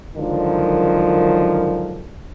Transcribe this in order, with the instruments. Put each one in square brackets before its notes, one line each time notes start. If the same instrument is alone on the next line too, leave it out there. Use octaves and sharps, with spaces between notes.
[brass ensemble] C#2 F#2 D3 D#3 F3 F#3